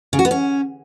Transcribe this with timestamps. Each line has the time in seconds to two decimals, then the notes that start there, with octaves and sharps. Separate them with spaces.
0.13 C#3
0.19 F#4
0.25 B3
0.31 C#4